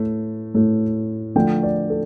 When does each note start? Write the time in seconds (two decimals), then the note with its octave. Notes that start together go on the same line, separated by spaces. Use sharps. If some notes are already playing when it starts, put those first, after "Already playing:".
Already playing: A2 A3
0.54 A2 A3
1.36 D3 F3 A3 G5
1.63 D5
1.90 A4